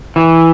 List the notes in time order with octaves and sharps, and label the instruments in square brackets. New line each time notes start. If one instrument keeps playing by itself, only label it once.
[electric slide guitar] E3